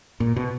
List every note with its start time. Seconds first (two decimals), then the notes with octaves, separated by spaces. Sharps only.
0.20 A#2
0.36 B2